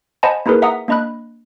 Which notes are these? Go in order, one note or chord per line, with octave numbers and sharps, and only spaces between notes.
C5 D#5 F#5 G#5 A5 B5
A#3 D#4 E4 G#4 A#4 B4
E5 F#5 A#5 D#6
A#3 D4 D#5 B5 F#6